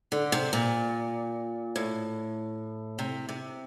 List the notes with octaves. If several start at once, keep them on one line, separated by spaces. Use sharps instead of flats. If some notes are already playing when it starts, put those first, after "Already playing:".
D3
C3
A#2
A2
C3
C3